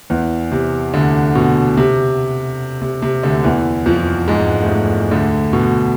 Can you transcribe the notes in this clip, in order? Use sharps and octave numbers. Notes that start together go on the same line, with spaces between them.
E2 E3
C3
D2 D3
B2
C3
C3
C3
D2 D3
E2 E3
F2 F3
G#2 G#3
A3
G#2 G#3
D2 D3
B2